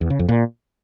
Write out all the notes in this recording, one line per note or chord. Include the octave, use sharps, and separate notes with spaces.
E2
C#3
F2
A#2